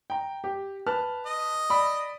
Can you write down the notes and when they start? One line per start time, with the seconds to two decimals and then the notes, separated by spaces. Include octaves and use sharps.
0.10 G5 A#5
0.44 G4
0.86 B4 A5 F6
1.26 D#5
1.70 D5 B5 E6